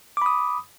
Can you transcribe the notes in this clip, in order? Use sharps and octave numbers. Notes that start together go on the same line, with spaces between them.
B5 D6 D#6